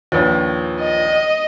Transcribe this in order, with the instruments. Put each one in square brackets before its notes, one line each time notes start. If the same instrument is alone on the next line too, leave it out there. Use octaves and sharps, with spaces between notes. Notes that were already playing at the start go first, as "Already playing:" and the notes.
[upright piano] A#1 D#2 [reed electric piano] F4 B4 C#5
[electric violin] D#5